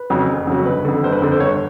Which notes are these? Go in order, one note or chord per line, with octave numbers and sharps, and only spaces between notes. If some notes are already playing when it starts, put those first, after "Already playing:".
Already playing: B4
F2 C#3 F#3
F#1
F2 C#3 F#3
G1 B4
F2 D3
G1 C5
B4
F2 D3 C5
C5
G1 C#5